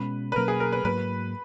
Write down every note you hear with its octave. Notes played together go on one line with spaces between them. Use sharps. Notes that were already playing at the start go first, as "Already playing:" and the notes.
Already playing: B2 G#3 C#4 B4
B4
B2 F#3 A#3 C#4 A#4
G#4
A#4
B4
G#2 F#3 A#3 B4